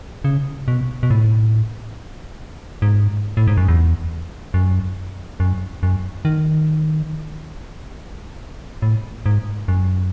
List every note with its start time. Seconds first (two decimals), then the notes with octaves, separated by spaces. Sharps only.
0.24 C#3
0.68 B2
1.03 B2
1.11 A2
2.82 G#2
3.37 A2
3.47 G#2
3.57 F#2
3.68 E2
4.54 F#2
5.40 F#2
5.83 F#2
6.25 D#3
8.82 A2
9.26 G#2
9.68 F#2